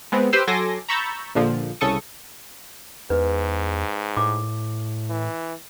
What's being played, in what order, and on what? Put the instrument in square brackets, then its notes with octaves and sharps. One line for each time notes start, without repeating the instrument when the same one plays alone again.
[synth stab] G#3 B3 C4
G4 B4 C5 G5 C6 E6
F#3 A4 G#5 C6 D6 A#6
A#5 B5 C#6 E6 G6 A6
A#1 A#2 D3 F3
C2 C#3 A4 C#6 D#6
[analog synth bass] E2 [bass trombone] G#2 [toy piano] B4
[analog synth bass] A2 [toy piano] D6
[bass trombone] E3